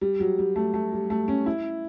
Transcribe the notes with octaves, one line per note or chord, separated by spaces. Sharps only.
G3
F#3
G3
A3
A3
G3
A3
C#4
E4